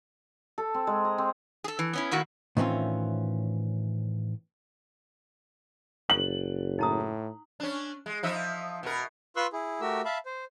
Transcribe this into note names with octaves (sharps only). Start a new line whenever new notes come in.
A4
C4
G#3
A#5
C4
G#4 A4
E3
B3 C#4 E4
A2 D#3 A#3 E4 F#4
A2 D#3 E3 C4 C#4 F4
F#1 F#7
A2 D#4 A#5 D#6
C#4 D4
G#3
F3 D#4 E5
B2 A#4
F4 B4 C6 C#6 E6 F#6
E4 G#4
A3 F#4 G4 A#4 E6
E5 F5 A5 B5
C5